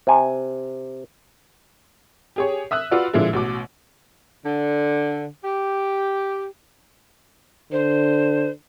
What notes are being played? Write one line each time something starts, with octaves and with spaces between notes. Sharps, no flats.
C3 G#5
G4 G#4 C#5
E5 D#6 E6 F#6
F4 F#4 B4 D5
A#2 D3 F3 G#3 E4
A1 B2 D6
D3
G4
D3 C5